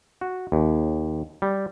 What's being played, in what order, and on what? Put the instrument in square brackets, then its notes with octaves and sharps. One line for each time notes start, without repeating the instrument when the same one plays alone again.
[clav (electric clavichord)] F#4
D#2
G3